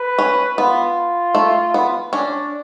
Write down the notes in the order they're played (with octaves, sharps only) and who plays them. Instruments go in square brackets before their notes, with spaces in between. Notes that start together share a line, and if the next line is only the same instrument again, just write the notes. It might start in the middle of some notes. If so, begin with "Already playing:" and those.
Already playing: [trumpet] B4
[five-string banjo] C#4
[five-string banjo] B3 [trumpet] F4
[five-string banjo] A3
B3
[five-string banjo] C#4 [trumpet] D4